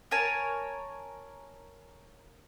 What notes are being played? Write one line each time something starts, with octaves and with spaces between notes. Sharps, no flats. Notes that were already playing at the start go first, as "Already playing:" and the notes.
A#4 C#5 G#5 A5